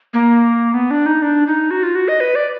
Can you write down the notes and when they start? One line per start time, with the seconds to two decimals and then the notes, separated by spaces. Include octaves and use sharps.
0.14 A#3
0.74 B3
0.91 D4
1.06 D#4
1.22 D4
1.47 D#4
1.71 F#4
1.83 F4
1.95 F#4
2.08 D#5
2.20 B4
2.35 D5